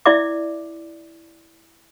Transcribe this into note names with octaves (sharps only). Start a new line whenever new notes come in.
E4 D5 E5 D6